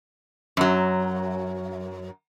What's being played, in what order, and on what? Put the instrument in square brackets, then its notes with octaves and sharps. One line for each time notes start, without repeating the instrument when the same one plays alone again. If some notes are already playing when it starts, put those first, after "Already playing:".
[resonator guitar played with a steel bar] F#2 F#3